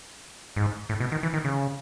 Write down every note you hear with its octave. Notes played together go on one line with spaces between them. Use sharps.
G#2
A2
B2
D#3
E3
D#3
C#3